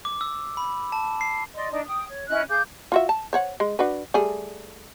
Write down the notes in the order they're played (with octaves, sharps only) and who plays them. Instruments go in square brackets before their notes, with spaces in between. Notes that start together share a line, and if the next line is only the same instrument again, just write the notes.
[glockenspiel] D6
E6
B5
A5
C7
[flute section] D5 D#5 C6
D4 D#4
G5 D#6
C#5
C#4 E4 D#5 F#6
G#4 F5 D6 G6
[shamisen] F4 F#4 E5
A5
C5 C#5 F#5
G#3
D4 F#4 B4
G3 A3 G#4